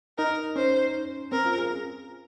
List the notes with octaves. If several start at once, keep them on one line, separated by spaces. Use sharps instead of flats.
D#4 A#4
C#4 C5
C4 A#4
F4
G#4